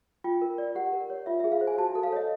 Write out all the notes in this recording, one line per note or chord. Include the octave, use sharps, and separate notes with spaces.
F4 G5
A#4
D5
G4 F#5
A#4
C#5
F4 E5
G#4 E5
F5
C5
G#5
F#4 A5
A4
F5
C#5 D#5